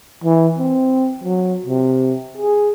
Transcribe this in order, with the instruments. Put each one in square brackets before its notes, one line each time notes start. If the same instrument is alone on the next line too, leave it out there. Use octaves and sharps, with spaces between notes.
[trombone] E3
C4
F#3
C3
G#4